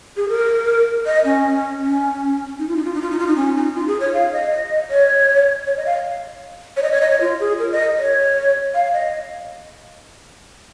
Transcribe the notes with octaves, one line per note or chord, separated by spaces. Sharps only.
G#4
A#4
D#5
C#4
C#4
D#4
F4
D#4
F4
D#4
F4
D#4
F4
D#4
C#4
D#4
F4
G#4
C#5
F5
D#5
D#5
C#5
C#5
D#5
F5
C#5
D#5
C#5
D#5
C#5
F4
G#4
A#4
D#5
C#5
F5
D#5